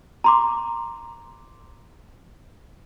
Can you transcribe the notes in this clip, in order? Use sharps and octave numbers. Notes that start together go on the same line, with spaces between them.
A#5 C6 D6